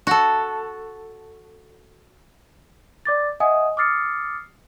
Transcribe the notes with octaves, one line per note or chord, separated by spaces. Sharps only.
F#4 A4
D5 D6 A6
D#5 E5 F#5 G#5 D#6
D6 D#6 F6 A6 C7 C#7